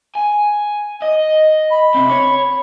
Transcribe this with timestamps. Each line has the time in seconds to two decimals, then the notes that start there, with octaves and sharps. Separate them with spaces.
0.15 G#5
1.02 D#5
1.71 B5
1.95 C3 C4
2.10 C#5